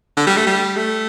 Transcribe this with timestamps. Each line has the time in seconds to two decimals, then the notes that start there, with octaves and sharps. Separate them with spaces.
0.16 D3
0.27 G3
0.36 A3
0.47 G3
0.76 A3